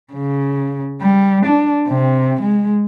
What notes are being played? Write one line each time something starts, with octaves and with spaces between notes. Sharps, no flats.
C#3
G3
D4
C3
G#3